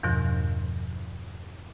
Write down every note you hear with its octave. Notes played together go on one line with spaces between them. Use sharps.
E2 G2 B2 F3